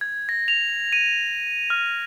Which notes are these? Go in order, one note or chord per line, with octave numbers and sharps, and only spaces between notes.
G#6
A#6
F7
D#7
F6